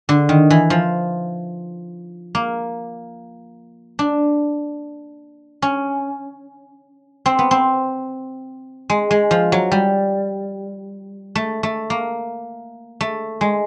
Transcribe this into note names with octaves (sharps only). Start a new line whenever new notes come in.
D3
D#3
E3
F3
A#3
D4
C#4
C4
B3
C4
G#3
G#3
F3
F#3
G3
A3
A3
A#3
A3
G#3